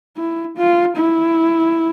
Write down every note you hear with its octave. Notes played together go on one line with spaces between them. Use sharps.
E4
F4
E4